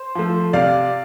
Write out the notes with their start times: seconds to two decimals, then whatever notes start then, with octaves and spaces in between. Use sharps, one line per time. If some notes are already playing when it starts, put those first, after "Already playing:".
Already playing: C5
0.15 F3 A3
0.53 C3 D5 F5